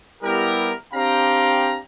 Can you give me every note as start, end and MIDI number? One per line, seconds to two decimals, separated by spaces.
0.23 0.73 55
0.23 0.73 59
0.23 0.73 64
0.23 0.73 67
0.23 0.73 70
0.93 1.78 60
0.93 1.78 62
0.93 1.78 67
0.93 1.78 77
0.93 1.78 79
0.93 1.78 82